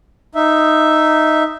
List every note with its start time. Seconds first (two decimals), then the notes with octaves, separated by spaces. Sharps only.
0.35 D#4 E5